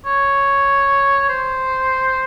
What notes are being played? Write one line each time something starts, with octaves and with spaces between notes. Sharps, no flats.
C#5
C5